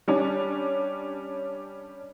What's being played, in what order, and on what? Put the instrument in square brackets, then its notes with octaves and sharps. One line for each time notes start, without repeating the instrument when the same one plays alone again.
[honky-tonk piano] G3 C#4 D4